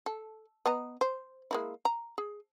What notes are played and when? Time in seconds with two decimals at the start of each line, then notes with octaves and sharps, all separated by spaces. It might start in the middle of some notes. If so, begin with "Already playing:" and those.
0.06 A4
0.66 B3 D#5 A#5
1.01 C5
1.51 G#3 A#3 E4
1.85 A#5
2.18 G#4